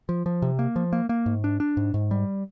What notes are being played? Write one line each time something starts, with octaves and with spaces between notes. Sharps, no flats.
F3
F3
C3
A#3
F3
A#3
A#3
G#2
D4
D4
G#2
G#2
G3